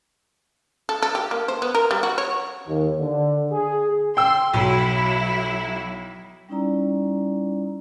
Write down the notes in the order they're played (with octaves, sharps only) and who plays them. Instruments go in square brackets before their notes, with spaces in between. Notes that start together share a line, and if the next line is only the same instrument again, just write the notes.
[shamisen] A4
A4
G4
A#3
C5
B3
A#4
G3
F#4
C#5
[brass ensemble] D#2
D3
G#4
[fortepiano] G5 E6 [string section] C6
[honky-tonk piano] B1 [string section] F#3 E4
[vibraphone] G3 C#4 D#4 E4 D5 A#5